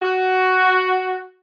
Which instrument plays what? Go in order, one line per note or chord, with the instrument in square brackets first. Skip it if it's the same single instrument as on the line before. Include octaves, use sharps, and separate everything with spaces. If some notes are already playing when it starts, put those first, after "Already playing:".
[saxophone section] F#4